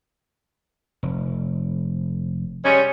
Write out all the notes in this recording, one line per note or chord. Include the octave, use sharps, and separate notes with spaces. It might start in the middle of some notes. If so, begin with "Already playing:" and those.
F1
G3 G#3 C#4